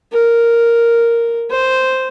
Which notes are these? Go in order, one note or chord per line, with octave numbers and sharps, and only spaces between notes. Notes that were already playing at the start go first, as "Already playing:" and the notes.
A#4
C5